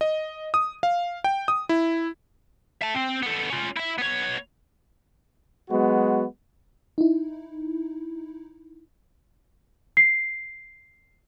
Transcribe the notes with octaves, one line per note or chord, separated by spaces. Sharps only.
D#5
D#6
F5
G5
D#6
E4
E5 A5
C4
B3 A4
C#4 F4
E4 E5
B3 C#5
F#3 G#3 B3 F#4
D#4 E4
C7